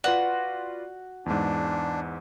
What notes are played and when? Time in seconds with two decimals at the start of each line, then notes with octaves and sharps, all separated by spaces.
0.04 F4 F#4 B4 D5
1.26 E2 G#2 D4